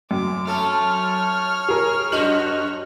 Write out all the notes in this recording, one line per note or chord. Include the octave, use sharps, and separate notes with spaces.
F#2 D6
A3 A4 C#5 F6
G#4 A#4
F#2 F#4 D#5 F#7